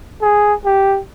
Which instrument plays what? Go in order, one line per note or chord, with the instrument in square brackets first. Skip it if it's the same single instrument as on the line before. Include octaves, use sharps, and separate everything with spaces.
[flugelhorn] G#4
G4